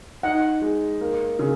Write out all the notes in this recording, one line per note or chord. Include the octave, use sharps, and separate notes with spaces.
D#4 F#5
G#3
A#3
C#3